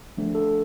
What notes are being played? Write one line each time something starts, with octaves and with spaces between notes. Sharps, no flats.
F3 A3 D4
A4